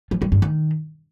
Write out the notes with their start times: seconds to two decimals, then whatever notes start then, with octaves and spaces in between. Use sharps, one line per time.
0.11 F3
0.22 G3
0.32 G2
0.42 D#3